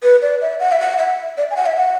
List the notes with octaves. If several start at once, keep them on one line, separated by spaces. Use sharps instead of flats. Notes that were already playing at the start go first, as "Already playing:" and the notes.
B4
D5
E5
F#5
E5
F#5
E5
D5
G#5
F#5
E5
F#5